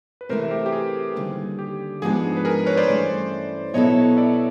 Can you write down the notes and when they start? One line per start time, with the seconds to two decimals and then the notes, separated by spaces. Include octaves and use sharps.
0.21 B4
0.29 C3 E3 A3 A#4 C5
0.51 G4
0.66 G4
0.73 G#4
1.16 D#2 D3 G3
1.59 G4
2.02 G#2 F3 G#3 B3 D4 G#4
2.37 B4
2.45 G#4 A#4
2.66 B4 C#5
2.77 C5 D5
2.88 G2 E3 A3 C#4
3.74 B2 F#3 B3 E4 A4 C#5 D#5
4.17 D5 E5